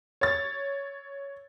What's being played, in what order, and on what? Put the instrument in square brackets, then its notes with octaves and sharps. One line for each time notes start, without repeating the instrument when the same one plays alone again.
[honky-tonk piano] C#5 A6